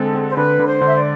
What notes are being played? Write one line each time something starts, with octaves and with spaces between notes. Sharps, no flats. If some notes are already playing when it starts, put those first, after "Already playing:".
Already playing: D3 G#3 C4 A4
C4
C5
D3 B4
D3
C5
D3 E5
D5